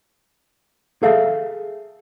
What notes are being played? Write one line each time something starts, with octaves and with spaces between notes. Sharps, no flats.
G#4 A4 E5 F5